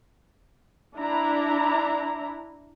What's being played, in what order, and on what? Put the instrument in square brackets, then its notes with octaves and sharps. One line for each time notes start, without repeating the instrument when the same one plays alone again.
[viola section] D4 E4 A#5